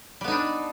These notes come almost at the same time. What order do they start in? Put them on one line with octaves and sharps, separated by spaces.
G3 B3 D#4 D4